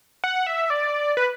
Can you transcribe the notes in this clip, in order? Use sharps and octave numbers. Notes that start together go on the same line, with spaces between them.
F#5
E5
D5
B4